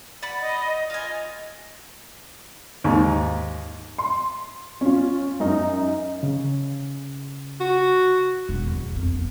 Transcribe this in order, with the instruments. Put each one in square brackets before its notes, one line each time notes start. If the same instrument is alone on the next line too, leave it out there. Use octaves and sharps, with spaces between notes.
[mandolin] D5 F#5 B5
[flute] D#5
[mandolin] F4 G#5 [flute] D#5
[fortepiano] D#2 G#2
[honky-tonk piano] C6
C#4 F4
F#2 D#4
[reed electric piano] C#3
[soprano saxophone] F#4
[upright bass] E1
E2
F2 C4
B3